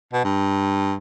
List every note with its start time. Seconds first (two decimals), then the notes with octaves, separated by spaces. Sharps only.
0.13 B2
0.24 G2